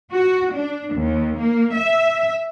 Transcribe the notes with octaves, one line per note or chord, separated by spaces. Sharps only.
F#4
D4
D#2
A#3
E5